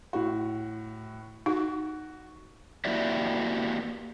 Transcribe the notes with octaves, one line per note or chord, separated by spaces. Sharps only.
A2 F#4
D#4 F#4
A#3 E4 F#4 G4 D5 E5